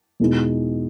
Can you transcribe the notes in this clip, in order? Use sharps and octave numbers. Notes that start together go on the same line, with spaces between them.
E2 B2 G#3 B3 D#4